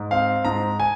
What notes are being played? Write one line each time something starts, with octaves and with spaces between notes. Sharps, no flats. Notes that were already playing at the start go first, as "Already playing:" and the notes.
Already playing: G#2
C4 F5
G#2 A#5
G#5